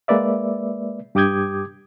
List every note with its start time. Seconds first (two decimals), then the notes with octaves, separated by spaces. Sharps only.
0.08 G#3 A#3 B4 D5 E5
1.15 G2 G4 D6 D#6 G6 G#6